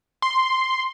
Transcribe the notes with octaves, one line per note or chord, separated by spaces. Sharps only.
C6